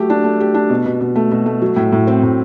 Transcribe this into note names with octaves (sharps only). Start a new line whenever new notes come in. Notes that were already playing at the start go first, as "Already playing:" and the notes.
Already playing: F#3 A3 G4
D4
A3
G4
D4
B2
B2
B2
A3
B2
A3
F#3
A2
A2
C4
A2